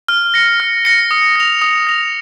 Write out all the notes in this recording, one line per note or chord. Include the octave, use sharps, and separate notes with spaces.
F6
A#6 C#7
F6
A#6 C#7
D#6
A#6 F7
D#6
A#6 F7